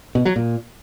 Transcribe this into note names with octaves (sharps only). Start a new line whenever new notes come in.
B2
F#3
A#2